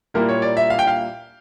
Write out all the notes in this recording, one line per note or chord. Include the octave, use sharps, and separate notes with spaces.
A#2 G3 A#3 E4 A#4
C#5
D5
E5
F5
G5
F5